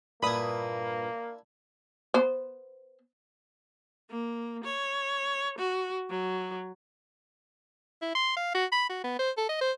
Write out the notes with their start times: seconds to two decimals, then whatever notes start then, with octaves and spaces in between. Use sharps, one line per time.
0.23 G2 A#2 A#3 D4 E4 B4 B5 D#6
2.14 B3 C5
4.10 A#3
4.64 C#5
5.58 F#4
6.10 F#3
8.02 E4
8.15 C6
8.36 F5
8.55 F#4
8.72 B5
8.90 F#4
9.04 B3
9.19 C5
9.37 A4
9.49 D#5
9.61 C5